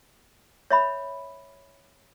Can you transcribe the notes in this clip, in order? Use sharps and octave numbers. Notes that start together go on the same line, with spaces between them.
C#5 E5 B5